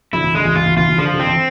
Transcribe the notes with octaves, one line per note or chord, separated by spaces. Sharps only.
D3 F3 E4
E3
D3 G#3
E3
E3 F4
E3
E3 F4
E3
D3 F3
D3
C4
E3